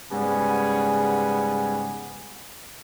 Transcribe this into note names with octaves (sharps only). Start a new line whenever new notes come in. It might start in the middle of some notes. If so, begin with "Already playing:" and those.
G#2 C#3 G3 B3 F#5 G#5